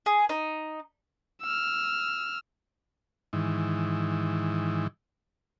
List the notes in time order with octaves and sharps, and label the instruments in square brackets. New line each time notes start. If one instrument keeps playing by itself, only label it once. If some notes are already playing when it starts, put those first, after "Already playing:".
[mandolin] G#4
D#4
[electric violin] E6 F6
[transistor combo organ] G#2 D#3 E3